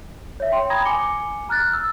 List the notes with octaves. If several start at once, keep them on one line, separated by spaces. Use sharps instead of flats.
C#5 E5
G5 C6
A#5 B5 D#6 G#6 A#6
G#5 D6 C#7 G7
A#5 F6 F#6 A6
E6